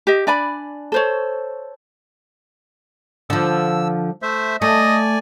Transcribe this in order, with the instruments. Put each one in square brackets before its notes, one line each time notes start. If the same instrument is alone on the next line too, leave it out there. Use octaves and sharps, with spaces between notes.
[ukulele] G4 D#5
D4 D5 G#5 B5
A4 C5 C#5
[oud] D3 F3 [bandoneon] E6
[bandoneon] A3 C5 E5
[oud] A3 [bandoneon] D5 G#5 [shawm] D#5